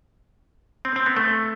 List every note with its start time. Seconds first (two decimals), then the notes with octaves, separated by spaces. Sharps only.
0.85 C4
0.96 C4
1.06 B3
1.16 A3